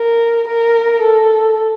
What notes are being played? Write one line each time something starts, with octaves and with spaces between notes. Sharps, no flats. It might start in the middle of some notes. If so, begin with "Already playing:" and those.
Already playing: A#4
A#4
A4